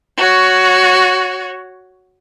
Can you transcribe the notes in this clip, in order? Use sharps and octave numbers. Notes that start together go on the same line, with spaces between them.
F#4 C#5